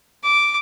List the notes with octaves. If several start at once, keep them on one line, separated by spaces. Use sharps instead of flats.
D6